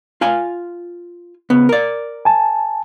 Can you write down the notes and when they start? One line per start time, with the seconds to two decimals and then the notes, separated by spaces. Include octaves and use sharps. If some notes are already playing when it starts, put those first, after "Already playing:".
0.21 F4 F5 G#5
1.50 C#3 B3
1.69 A#4 D5
2.25 G#5 A5